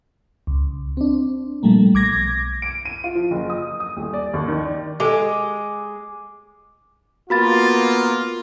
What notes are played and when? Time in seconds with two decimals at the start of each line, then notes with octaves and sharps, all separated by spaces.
0.47 C#2
0.97 C4 D4
1.63 A#2 F3 G3 A3 A#3
1.94 B1 D6 G#6 A#6
2.62 D7
2.85 D#7
3.04 F4
3.15 F3
3.31 F#1
3.50 D#6
3.80 D#6
3.97 D#1
4.13 D5
4.34 D#2
4.48 D#3
4.66 D5
5.00 G#3 G4 A4 D6
7.30 A#3 B3 F4 F#4 B5 A6